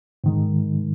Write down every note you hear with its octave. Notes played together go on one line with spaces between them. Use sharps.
G#2 D#3 G#3